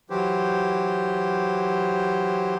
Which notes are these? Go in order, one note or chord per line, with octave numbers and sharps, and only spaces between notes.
E3 F#3 G4 C5